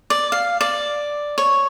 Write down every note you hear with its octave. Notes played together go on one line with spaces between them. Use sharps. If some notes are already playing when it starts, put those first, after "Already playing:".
D5
F5
D5
C#5